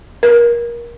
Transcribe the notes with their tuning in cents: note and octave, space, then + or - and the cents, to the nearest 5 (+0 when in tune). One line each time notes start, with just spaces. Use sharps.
A#4 +25